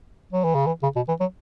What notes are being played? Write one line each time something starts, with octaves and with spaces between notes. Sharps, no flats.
F#3
E3
C#3
E3
C#3
B2
E3
F#3